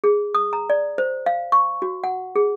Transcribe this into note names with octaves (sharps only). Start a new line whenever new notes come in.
G#4
D#6
A#5
D5
C5
F5
C#6
F#4
F#5
G#4